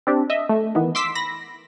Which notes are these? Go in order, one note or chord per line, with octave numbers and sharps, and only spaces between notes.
C4 D4 G4
D#5 E5
A3
D#3 E3 B3
C6 D6 E6 B6
B5 A#6